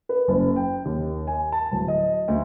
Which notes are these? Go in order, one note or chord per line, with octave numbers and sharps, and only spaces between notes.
B4
F#1
G5
D#2
G#5
A5
D1
D#5
D2